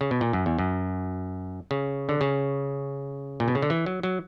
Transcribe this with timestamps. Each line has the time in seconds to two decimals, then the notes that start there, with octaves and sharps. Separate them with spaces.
0.01 C#3
0.11 B2
0.21 A#2
0.33 F#2
0.46 E2
0.59 F#2
1.71 C#3
2.09 D3
2.21 C#3
3.40 A#2
3.48 B2
3.55 C#3
3.62 D3
3.70 E3
3.86 F#3
4.03 F#3